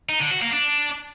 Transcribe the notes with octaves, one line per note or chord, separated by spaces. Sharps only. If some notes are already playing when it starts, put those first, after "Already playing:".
D#4
D3
F#4
A#3
D4